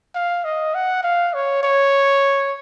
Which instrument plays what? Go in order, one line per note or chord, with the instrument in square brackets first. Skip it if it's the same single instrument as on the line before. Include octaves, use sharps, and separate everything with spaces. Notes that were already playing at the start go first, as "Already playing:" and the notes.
[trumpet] F5
D#5
F#5
F5
C#5
C#5